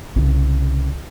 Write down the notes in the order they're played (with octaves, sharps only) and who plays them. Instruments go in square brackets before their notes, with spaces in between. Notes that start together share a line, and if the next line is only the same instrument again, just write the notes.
[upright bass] C2 C#3